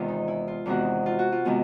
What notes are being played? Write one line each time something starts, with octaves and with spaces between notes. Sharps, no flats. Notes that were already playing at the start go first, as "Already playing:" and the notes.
Already playing: E2 C3 D#3 G#3 B3 F4
D#4
E4
F4
E2 C3 D#3 G#3 B3 F#4
F4
F#4
F4
C3 D#3 G#3 B3